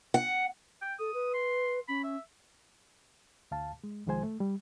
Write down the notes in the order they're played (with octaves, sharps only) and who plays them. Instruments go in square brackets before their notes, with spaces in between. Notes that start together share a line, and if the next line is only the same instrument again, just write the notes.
[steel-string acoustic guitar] F#5
[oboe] G5
[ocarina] A4 [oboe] D#6
[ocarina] B4
[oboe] C6
[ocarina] C#4 [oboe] B5
[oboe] E5
[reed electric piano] D2 F5 A5
G#3
C2 D#3 F3 G#3 C5 G#5
A3
G3